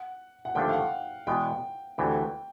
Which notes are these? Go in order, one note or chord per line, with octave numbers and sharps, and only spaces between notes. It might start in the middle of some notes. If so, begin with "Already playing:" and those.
Already playing: F#5
F#5
D#2 D3 F3 A3 D4 G5
F5
F#5
E2 B2 G#3 B3 G5
D2 C3 E3 A3 G5